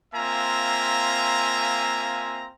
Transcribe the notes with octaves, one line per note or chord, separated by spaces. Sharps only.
A#3 C4 F4 E5 G#5 A#5